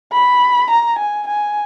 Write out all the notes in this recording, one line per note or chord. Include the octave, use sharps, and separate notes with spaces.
B5
A#5
G#5
G#5